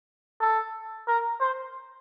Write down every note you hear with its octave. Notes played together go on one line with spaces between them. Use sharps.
A4
A#4
C5